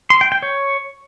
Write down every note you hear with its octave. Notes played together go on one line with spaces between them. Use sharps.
C6
G5
G5
C#5